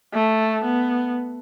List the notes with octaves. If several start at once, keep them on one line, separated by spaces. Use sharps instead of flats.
A3
B3